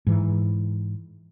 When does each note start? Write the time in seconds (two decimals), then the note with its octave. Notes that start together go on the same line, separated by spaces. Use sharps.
0.07 G#2 E3